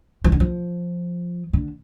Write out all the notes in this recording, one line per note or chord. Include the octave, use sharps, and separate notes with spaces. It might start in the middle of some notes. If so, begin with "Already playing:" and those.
F3
D3
F3
D3